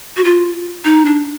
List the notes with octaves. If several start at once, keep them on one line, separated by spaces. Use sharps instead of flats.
F#4
F4
D#4
D4